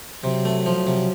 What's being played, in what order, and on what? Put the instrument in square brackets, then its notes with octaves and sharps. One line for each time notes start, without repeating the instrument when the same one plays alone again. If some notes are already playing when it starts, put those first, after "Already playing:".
[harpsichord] C3 [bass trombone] F#3
[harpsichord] A3
F3
C3